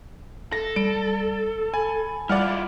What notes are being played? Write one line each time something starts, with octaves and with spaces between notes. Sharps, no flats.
A4 A#6
G3 D7
G#5 B5
G3 E4 F4 D5 F#5 F6